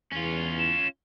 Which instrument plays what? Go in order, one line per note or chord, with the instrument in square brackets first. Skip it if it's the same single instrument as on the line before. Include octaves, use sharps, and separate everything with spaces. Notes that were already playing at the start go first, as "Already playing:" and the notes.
[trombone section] E2 [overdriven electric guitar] C#4 F4
[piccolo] E7